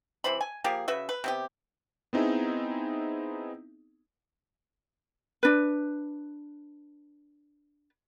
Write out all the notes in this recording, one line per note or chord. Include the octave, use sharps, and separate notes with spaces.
C3 E3 C5 B5
G#5
F3 A#3 G4 G#4
C#3 F#4 B4 E5
B4
C3 B3 G4
B3 C4 D#4 E4 G#4
D4 B4